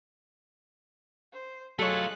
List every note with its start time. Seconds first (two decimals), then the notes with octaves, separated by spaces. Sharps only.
1.33 C5
1.79 F#3 G#3 A3 F4 A4 C#5 F#6